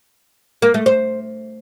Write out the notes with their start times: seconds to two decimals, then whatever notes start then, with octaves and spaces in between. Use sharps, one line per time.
0.62 A#3
0.74 A3
0.86 C5